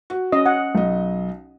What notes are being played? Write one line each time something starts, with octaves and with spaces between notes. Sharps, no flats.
F#4
C#4 D#5
F#5
B1 D#5